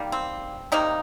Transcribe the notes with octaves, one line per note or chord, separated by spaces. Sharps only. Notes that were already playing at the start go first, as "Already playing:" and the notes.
Already playing: D#3 G3 A#3
C4
C3 D#3 G3 A#3 D#4